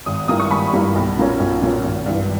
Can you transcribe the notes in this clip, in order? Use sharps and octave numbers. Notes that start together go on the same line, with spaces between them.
G#1 D#6
G2 G3 A#3 E4 D#6
C#6
G#1 B5
G2 G3 A#3 E4
B1
A#2 A#3 C#4
B1
A#2 A#3 C#4
G#1
G2 E3